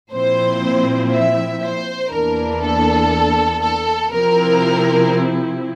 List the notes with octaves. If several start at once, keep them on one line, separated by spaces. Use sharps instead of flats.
A#2 F3 C4 E4 C5
E5
C5
E2 E3 A#3 D4 A#4
A4
A4
C3 F3 C4 E4 A#4